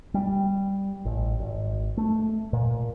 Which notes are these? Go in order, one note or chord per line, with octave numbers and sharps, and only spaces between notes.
G3
A1
G#1
A3
A#2